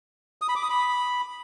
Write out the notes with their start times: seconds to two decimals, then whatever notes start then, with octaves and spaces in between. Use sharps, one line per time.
0.42 D#6
0.49 B5
0.56 D6
0.63 D#6
0.70 B5